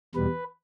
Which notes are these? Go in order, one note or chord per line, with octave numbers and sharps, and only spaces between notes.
E2 B2 G3 B4